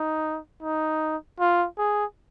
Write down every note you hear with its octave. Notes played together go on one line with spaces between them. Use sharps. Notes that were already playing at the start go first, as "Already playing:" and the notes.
Already playing: D#4
D#4
F4
G#4